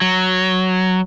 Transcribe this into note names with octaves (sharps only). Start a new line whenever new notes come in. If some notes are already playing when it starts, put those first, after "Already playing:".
F#3